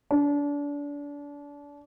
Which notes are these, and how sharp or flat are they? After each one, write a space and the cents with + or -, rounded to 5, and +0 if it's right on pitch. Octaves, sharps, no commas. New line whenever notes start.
D4 -30